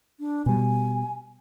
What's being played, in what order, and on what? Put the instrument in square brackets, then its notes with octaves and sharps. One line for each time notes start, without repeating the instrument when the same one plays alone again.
[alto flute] D4
[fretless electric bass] B2 G3 [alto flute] G#5